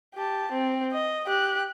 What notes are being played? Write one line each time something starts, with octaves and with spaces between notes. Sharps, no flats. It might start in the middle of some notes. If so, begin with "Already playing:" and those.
G4 A5
C4
D#5
G4 F#6